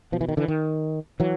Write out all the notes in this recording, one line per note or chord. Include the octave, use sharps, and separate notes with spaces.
B2 F3
E3
D#3
D3 E3
D#3
E3 F#3